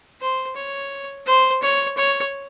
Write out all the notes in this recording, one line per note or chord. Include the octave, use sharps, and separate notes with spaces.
C5
C#5
C5
C#5
C#5